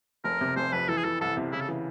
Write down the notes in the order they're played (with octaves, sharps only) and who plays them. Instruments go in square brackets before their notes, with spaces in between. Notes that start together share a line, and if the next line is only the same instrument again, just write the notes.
[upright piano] F1 [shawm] A#4
[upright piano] C3
[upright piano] F1 [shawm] C5
[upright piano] F2 [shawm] B4
[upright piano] E3 [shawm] A4
[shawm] G#4
[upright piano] E3 [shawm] A4
[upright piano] C2 [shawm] A4
[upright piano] C3
[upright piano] C#3 [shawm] E4
[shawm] A4
[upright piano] E3